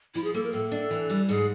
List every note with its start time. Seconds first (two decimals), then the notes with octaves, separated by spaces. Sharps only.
0.15 F3 E4
0.24 G#4
0.34 A#3 A4
0.44 A#4
0.53 A2 A4
0.72 D4
0.91 E3
1.10 G3
1.29 G#2 G#4